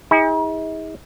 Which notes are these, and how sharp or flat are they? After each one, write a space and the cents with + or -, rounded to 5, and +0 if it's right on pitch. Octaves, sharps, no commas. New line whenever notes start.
D#4 +45 G#4 -35